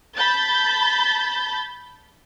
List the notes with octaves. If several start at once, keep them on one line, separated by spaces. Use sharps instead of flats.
A5 B5 G6 A6